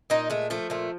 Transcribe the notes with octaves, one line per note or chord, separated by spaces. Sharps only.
A#2 D#4
G#3 A3
F3 A3
A#2 A3